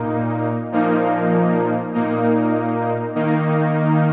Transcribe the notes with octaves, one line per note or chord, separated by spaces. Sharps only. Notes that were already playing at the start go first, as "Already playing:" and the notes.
Already playing: A#2 A#3 D#4
A#2 F3 A#3 D#4
A#2 A#3 D#4
D#3 A#3 D#4